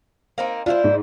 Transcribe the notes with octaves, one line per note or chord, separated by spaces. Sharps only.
A#3 C4 D#4
D4 E4 F4 C5
G#2